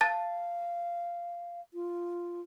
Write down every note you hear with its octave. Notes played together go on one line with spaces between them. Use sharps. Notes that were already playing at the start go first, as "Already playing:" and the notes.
F5 A5 A6
F4